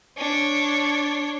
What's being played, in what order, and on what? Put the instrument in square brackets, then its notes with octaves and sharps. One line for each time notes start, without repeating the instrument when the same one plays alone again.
[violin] D4 C#5